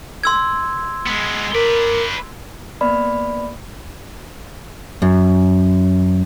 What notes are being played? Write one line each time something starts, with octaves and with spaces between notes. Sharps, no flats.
C6 E6 G#6
G#3 B3
A#4 B4 D5
A#3 B3 D5 B5
F#2